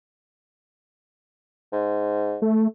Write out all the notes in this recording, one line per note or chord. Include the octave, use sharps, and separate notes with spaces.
G#2
A3